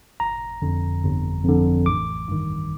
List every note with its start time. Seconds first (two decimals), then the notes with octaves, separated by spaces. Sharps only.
0.20 G1 A#5
0.62 F2 D3
1.03 G1
1.45 F2 D3
1.86 A1 D6
2.28 G2 D#3